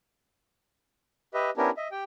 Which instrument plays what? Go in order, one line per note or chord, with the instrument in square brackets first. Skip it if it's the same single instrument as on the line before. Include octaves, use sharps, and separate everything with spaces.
[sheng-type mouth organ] G4 B4 D#5 E5
B3 C#4 D4 E4 G4 A#4
D#5 E5
G4 G5